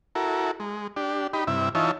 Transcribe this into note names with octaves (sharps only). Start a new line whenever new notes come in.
E4 F#4 A4 A#4
G#3
D4 G4
D#4 G4 B5
G2 C3 E4 E5
E3 D#4 F4 C#5 E5 A5